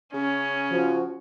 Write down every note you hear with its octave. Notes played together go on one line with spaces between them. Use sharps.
C#3 C#4
F3 F#4